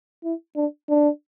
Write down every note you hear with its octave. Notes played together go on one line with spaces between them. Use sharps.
E4
D4
D4